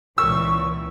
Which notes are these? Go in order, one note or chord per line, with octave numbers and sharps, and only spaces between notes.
C#2 A#2 E3 C#6 E6